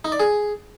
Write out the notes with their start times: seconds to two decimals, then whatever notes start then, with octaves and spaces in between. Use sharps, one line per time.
0.05 D#4
0.12 D5
0.20 G#4